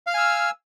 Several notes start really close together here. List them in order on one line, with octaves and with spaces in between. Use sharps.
F5 F6 G#5 E6